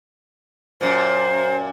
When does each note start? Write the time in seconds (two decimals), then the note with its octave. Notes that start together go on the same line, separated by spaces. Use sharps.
0.81 F#2 A#2 C5